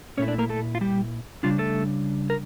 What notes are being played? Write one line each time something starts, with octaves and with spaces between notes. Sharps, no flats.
A#2 A3 C#4 E4 C#5
D4 D5
A#3 A#4
A3 A4
F4
G3 G4
C#3 G3 D4 F4
A3 A4
A#4